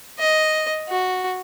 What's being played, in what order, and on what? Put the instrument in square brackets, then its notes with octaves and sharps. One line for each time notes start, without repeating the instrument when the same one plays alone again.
[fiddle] D#5
F#4